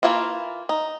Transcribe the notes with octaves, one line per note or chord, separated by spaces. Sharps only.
E3 G3 A#3 E4 F4
D#4